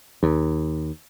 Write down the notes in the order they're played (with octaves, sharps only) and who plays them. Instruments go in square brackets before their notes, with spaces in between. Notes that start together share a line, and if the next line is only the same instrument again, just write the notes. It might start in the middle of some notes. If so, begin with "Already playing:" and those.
[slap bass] D#2